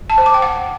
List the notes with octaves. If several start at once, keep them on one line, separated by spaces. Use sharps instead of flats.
A5
C5
D6
G5
F#5